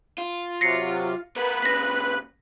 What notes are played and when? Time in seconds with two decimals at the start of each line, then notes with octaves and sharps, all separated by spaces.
0.18 F4
0.61 C3 F#3 A#6 C7 C#7
1.36 B3 A#4 B4 F#6
1.62 A#2 C#3 A#6 B6